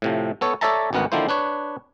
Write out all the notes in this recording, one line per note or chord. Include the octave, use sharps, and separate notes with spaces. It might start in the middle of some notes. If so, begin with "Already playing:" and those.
A2 C3 F3
B3 A4 C#5
A4 C#5 D5 E5 A5 A#5
G#1 D2 B3 A#4 F#5
D3 D#3 F3 A#3 E4 C5
D4 B4 C#5